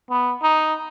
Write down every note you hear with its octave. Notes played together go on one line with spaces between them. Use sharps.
B3
D#4